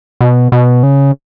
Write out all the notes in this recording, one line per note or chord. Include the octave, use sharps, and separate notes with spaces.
B2
B2
C#3